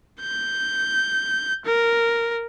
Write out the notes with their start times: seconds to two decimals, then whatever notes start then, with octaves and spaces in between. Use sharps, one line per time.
0.21 G6
1.65 A#4